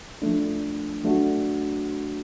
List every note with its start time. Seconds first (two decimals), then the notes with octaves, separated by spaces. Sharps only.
0.22 F3 A3 D4
1.04 F#3 A3 D4 F#4